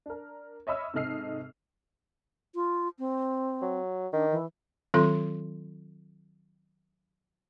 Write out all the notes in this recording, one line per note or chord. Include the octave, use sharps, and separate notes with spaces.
D4 A#4
C#5 D#5 E5 B5 E6 F6
G#2 C3 A4 D#5 F6 C7
F4
C4
F#3
D#3 D4
E3
D#3 F#3 C4 F4 A4 C6